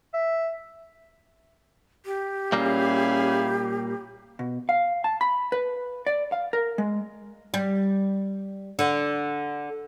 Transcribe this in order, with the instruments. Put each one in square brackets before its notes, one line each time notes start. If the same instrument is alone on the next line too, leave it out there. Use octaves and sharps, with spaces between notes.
[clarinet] E5
[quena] G4
[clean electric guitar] A#2 G3 A#3 [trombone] C#4 [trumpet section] E4 G#4 F5
[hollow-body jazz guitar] B2
F5
A5
B5
B4
D5
F5
A#4
G#3
[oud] G3
D3